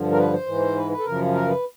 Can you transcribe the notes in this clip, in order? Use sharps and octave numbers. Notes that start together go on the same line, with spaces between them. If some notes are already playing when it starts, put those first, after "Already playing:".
Already playing: G2 D3 F3
A#4
B4
C5
G#2 E3
B4
B4
A4
F#2 C#3 F3 A#4
A#4
B4